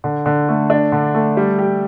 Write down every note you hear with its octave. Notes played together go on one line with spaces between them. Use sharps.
D3
D3
A3
D4
D3
A3
G3
G4